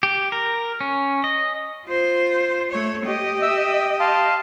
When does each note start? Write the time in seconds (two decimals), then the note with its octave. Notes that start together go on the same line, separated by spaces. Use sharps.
0.03 G4
0.32 A#4
0.81 C#4
1.24 D#5
1.86 F4 C5
2.71 A3 C#5
3.06 G4 D#5
3.42 E5 E6
4.00 F5 A5 C6